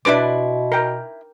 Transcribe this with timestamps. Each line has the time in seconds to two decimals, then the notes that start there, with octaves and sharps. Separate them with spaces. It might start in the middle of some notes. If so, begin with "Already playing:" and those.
0.05 B2 D4 E4 G#4 B4 C6 D6
0.72 A#4 G5